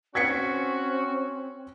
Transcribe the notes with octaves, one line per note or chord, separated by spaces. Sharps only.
C4 C#4 F#4 G#6 B6 C#7